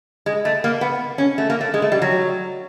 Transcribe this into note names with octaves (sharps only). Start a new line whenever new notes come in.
G#3
A3
A#3
B3
C#4
A3
A#3
A3
G#3
A3
G3
F#3